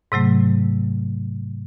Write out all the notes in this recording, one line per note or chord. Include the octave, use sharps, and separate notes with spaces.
G#2 C3 F#3 A3